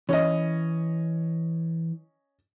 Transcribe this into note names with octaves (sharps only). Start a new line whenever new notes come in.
E3 C#4 D#5